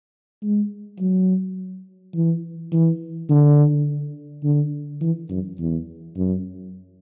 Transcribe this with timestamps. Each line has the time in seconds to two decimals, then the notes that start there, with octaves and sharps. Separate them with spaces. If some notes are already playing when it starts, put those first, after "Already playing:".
0.43 G#3
1.00 F#3
2.14 E3
2.72 E3
3.29 D3
4.44 D3
5.02 E3
5.30 F#2
5.59 E2
6.17 F#2